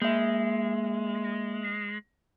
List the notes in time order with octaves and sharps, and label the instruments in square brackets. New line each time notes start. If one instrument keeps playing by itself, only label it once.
[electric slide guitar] G#3 [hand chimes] A#3 E5